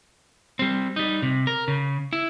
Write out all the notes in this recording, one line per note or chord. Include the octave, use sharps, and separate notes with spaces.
G3 C4
G3 D#4
C3
A#4
C#3
E4